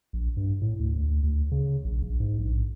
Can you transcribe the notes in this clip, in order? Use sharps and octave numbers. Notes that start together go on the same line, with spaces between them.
A#1
G2
A2
D2
D2
D2
C#3
A#1
A#1
G#2
A#1